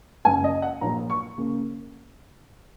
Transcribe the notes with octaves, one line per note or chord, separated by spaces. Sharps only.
F#1 F#2 C#3 G#5
D#5
F#5
A#1 A#2 F#3 A#3 A#5
C#6
C#3 A#3